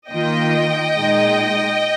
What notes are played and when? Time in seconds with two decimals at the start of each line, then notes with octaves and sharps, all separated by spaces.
0.10 D#3 A#3 F4 D#5 G5
0.97 A#2 G#3 D#4